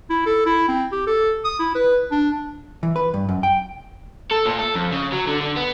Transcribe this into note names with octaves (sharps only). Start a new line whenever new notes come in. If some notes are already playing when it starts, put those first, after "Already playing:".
E4
A4
E4
C4
G4
A4
D#6
E4
B4
D4
E3
B4
G2
F#2
G5
A4
A#2
A4
F2
C#3
F#3
D3
D3
B3